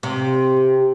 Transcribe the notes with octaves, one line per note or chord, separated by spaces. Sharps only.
C3